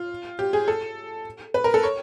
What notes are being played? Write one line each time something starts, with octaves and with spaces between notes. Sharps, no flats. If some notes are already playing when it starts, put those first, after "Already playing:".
Already playing: F4
G4
G#4
A4
B4
A#4
A4
C#5